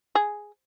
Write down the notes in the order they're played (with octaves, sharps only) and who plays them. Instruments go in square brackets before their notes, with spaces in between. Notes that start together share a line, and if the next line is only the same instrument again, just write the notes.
[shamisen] G#4